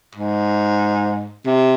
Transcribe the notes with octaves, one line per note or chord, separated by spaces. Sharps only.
G#2
C3